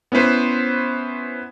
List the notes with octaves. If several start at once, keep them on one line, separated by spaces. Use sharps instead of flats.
B3 C#4 E4 B4 C5